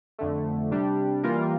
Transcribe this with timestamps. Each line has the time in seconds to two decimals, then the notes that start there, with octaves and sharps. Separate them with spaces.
0.19 F2 D3 A3
0.71 C3 G3 D4 G4
1.23 E3 G3 A#3 F4 A#4